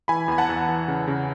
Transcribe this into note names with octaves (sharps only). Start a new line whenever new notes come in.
E3 G#5 B5
E2 G#5
F#5 A5
E2
E3
C#3
C#3